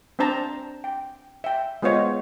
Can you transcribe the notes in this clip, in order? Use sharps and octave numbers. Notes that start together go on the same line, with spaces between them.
C4 D4 C5 A5 A#5
G5
E5 G5
G#3 B3 F4 C5 C#5 D#5